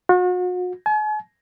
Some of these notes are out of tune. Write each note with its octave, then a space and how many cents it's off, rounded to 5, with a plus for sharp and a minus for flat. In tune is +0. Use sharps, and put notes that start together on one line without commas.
F#4 -40
G#5 +45